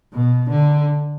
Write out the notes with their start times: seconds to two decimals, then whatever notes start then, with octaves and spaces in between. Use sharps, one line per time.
0.13 B2
0.49 D3